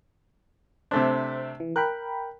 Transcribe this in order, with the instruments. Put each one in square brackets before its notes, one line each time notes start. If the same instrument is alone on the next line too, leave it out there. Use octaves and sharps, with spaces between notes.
[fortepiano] C3 A3 D4 [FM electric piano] C5
[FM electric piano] E3
[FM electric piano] A#4 G5 B5 [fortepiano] F#6